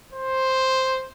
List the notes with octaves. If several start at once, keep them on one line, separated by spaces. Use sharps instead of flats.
C5